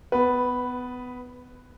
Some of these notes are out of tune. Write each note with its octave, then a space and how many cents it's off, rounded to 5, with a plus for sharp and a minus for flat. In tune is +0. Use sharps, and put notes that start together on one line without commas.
B3 +20 B4 +0